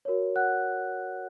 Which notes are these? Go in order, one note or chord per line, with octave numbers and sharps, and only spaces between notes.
F#4 A#4 C#5
F#5 F#6